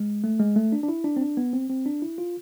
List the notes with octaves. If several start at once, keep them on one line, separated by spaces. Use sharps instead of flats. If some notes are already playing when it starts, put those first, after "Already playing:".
Already playing: G#3
A3
G#3
A3
D4
D4
E4
D4
C4
D4
B3
C4
C4
D4
E4
F4